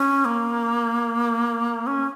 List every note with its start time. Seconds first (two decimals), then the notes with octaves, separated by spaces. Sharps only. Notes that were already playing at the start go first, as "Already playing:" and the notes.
Already playing: C#4
0.25 A#3
1.87 C#4